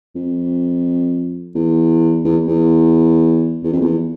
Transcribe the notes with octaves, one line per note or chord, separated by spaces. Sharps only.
F2
E2
E2
E2
E2
F2
E2